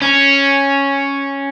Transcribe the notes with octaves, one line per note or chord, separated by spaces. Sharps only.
C#4